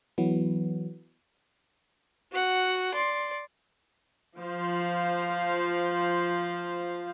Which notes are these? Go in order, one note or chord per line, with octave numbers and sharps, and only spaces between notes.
E3 F#3 B3
F#4 F#5
D5 C6
F3 C5 F5